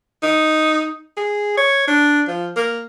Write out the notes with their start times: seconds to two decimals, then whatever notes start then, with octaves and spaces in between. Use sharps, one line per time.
0.23 D#4
1.17 G#4
1.57 C#5
1.88 D4
2.28 F3
2.56 A#3